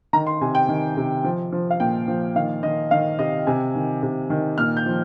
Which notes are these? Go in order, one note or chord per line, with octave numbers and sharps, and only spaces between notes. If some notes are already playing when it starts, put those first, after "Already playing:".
D#3 A#5
C6
C3 G#5
G5
D#3
C3
F3
F3
F5
A#2 G5
F3
D#3 F5
D#3 D#5
D#3 F5
C3 D#5
C3 G#5
D#3
C3
D#3
A#2 F6
G6
F3